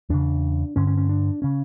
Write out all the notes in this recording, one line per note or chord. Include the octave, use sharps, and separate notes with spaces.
E2 C#3 D4
G2 D3 C#4
C#4
C#4
D4
C#3 C#4